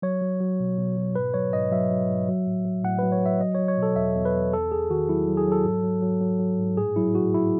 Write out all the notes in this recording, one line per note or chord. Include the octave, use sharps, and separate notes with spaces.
F#3 C#5
F#3
F#3
B2
B2
B2
G#2 B4
F#3 C#5
G#2 D#5
F#3 E5
F#3
G#2
F#3
A2
F#3
A2 F#5
F#3 B4
C#5
F#3 E5
F#3 D#5
F#3 C#5
C#5
B2
A4
E2 E5
E2
B4
E2
E2 A4
E2 G#4
D#3 F#4
F#3 E4
F#3
G#4
F#3 A4
G#2
F#3
F#3
F#3
F#3
G#2
A2 G#4
F#3 E4
A2 F#4
A2 E4